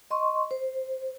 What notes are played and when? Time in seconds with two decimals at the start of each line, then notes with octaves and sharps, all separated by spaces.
0.11 D#5 C6 C#6
0.51 C5